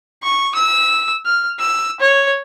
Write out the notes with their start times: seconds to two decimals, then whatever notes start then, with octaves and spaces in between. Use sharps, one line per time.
0.23 C#6
0.54 E6
1.25 F6
1.59 E6
2.00 C#5